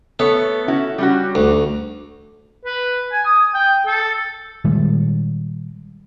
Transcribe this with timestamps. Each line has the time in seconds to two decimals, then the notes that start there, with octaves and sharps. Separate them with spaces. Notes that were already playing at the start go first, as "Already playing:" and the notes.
0.19 A3 B3 A4 C#5
0.68 C#4 E4 F#4
0.98 G3 C#4 F#4
1.35 D2
2.66 B4
3.12 G#5
3.25 D#6
3.54 G5
3.87 A4
4.64 A#2 D#3 G3 G#3